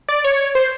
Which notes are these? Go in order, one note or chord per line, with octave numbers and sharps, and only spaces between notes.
D5
C#5
C5